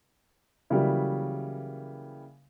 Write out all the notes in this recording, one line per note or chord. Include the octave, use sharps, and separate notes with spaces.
C#3 E3 F#3 G3 A#3